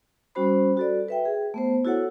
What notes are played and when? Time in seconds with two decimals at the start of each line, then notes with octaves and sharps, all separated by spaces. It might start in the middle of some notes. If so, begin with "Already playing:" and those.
0.35 G3 C#4 F#4 C5 B5
0.77 F#4 A4 D5
1.08 B4 E5 G5
1.25 G#4
1.54 A3 B3 C5
1.85 E4 F#4 A4 C#5 F#5